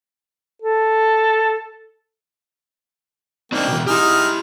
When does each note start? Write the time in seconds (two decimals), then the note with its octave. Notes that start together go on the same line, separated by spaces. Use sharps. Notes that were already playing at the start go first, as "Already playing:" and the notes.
0.62 A4
3.52 A#3 C4 D4 D#4 G5
3.68 B2 E3
3.86 D#4 E4 G4 G#4 F6